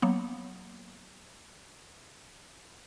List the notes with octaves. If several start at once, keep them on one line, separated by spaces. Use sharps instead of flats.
F#3 A#3 B3